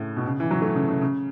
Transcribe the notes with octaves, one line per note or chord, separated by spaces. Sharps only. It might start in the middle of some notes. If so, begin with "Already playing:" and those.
Already playing: A2 C#3
B2
C#3
E3
F#3
A3
C#3
C#3
C#3